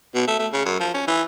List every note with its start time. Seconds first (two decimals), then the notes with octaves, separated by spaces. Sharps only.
0.14 B2
0.27 A3
0.39 A3
0.53 C#3
0.66 F#2
0.80 F3
0.94 C#4
1.07 E3